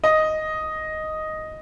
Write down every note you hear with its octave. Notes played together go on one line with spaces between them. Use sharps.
D#5